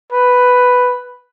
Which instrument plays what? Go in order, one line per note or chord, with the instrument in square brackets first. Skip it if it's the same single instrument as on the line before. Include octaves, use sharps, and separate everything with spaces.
[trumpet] B4